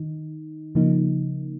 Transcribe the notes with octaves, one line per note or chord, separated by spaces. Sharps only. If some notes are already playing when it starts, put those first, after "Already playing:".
Already playing: D#3 D#4
C#3 F3 A#3 D#4